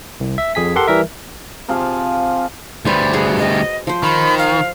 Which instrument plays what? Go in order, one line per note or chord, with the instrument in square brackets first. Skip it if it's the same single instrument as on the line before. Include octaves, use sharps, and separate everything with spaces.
[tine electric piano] C2
E5
F2 G#4 G#5 B6
G4 A4 A#4 F#5 C6
E3 G3 A#4 E5
[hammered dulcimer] C3 F3 G#4 F5
[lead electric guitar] D2 G3 [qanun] B4 C5 G#5
[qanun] F#4 G#4
[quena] D#5
[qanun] F3 C5
[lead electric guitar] D#3 [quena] B5
[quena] F5